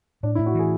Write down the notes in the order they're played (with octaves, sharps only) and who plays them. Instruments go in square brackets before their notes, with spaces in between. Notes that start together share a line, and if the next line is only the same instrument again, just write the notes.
[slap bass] A2 [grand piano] D4
[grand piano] E4
[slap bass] A2
[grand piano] F#4
[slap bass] E3 [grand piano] G#4